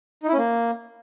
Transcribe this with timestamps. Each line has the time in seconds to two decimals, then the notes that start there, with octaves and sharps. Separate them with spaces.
0.23 D#4
0.28 E4
0.33 C#4
0.38 A#3